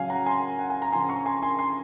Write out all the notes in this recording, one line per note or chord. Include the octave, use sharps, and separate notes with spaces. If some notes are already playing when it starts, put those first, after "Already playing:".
Already playing: C#3 F#3 F5 G#5
F#5 A#5
G#5 C6
F#5
G#5
A#5
C#3 F3 G#5 C6
A#5 C#6
G#5 C6
G#5 C6
G#5 C6